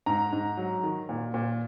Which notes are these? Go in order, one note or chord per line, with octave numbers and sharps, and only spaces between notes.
G#2 A#5
G#2
F#3
D#3
A#2
A#2